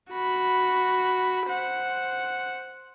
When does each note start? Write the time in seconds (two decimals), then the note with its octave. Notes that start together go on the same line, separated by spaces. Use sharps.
0.10 F#4 B5
1.48 C5 F#5